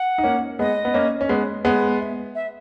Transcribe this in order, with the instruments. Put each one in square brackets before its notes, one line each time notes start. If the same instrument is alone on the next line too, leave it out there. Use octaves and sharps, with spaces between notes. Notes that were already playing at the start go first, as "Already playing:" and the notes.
Already playing: [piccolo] F#5
[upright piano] D#4
A#3 C#4
[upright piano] G#3 B3 [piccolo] D#5
[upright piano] B3
A#3 C#4
C#4
G#3 B3
G#3 B3
[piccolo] E5
E5